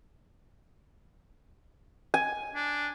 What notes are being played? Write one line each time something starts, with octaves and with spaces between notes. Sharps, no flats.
G#5
D4